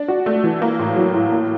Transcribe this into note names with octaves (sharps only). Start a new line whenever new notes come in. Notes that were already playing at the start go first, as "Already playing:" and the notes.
Already playing: D4
F#4
A3
E3
A#3
A2
F#3
A2
A#3